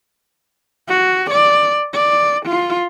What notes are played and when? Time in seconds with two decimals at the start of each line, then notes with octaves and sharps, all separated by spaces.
0.88 F#4
1.31 D5
1.93 D5
2.46 F4